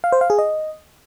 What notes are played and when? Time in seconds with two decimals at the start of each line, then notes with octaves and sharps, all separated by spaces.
0.04 F5
0.12 C5
0.21 F5
0.30 G#4
0.39 D#5